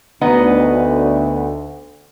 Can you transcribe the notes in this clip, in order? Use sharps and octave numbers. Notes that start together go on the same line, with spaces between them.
D2 B3 D#4 D#5